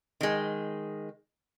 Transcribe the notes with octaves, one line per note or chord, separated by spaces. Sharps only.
D#3 G#3